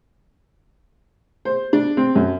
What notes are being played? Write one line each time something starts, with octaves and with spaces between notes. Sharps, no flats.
C5
D4
C4
F#2